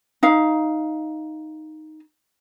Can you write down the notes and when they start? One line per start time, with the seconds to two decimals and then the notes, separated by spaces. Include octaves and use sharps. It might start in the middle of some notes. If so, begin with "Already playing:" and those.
0.23 D#4 F5